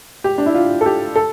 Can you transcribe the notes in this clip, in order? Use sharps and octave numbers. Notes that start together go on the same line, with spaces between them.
G4
D4
E4
F4
A4
G4
A4